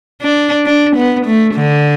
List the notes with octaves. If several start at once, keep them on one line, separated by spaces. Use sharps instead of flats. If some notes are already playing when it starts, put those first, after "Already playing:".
D4
D4
B3
A3
D3